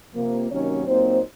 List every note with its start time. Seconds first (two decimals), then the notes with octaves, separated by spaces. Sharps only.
0.15 C3 F3 A#3
0.50 C3 D#3 F#3 A#3 C#4 D#4 C#5
0.86 A#2 F#3 A#3 C4 D#4 C5